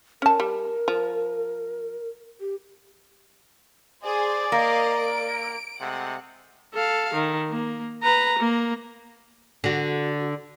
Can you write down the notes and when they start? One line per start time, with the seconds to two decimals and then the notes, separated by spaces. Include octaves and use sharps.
0.22 C#4 A#4 A5
0.40 G3
0.88 F3
2.40 G4
4.04 G#4 C5 D5
4.52 A#3 D#5 F5
4.98 D7
5.80 C3 G#3 A3 F#5
6.74 A4 F5
7.14 D#3
7.50 A#3
8.03 B4 A#5
8.39 A#3
9.64 D3 F#4